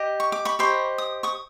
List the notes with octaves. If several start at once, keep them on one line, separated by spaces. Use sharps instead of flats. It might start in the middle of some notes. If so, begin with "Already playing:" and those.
Already playing: G4 D#5
C#6
D6
B5 C#6
G4 C5 D#5 B5 C#6
D#6
C#6 D#6